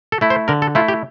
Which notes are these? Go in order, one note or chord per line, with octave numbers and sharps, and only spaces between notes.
A4
A3 E4
C5
D3 A#4
A4
A3 E4 F4
G4